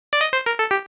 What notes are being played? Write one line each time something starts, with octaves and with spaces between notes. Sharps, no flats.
D5
D#5
C5
A#4
A4
G4